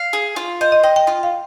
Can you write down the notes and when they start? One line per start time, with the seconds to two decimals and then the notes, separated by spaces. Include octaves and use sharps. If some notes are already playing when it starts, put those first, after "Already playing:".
Already playing: F5
0.13 G#4
0.36 F4
0.61 C5 D#5
0.72 D#5
0.83 D#5 G5
0.96 G5
1.07 F4 G5
1.23 F5